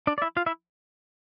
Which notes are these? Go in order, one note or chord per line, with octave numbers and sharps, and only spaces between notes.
D4 D5
D5
E4 E5
F4 F5
E4 E5